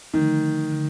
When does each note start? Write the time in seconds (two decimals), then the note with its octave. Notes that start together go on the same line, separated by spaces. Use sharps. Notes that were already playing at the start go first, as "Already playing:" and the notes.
0.14 D3 D#3 F3 A3
0.72 D3